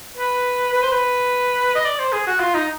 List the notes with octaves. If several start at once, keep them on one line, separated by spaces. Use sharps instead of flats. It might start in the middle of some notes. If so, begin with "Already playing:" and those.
B4
B4
C5
B4
D#5
D5
C5
G#4
F#4
F4
D#4